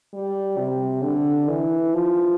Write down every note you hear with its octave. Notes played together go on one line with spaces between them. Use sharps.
G3
C3
D3
E3
F3